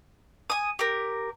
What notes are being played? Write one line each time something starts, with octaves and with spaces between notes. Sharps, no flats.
G#5 D#6
G4 A#4